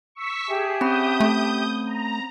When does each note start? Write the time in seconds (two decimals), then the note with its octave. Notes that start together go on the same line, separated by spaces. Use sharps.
0.15 C#6 E6 B6
0.48 G4 G#4 E5 A5
0.81 C4 C#4 B5 D#6 G6
1.20 A3
1.87 A#5